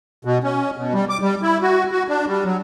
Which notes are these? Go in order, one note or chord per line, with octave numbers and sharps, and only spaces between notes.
B2
C#4
B2
G3
D6
G3
E4
F#4
F#4
D4
G3
F#3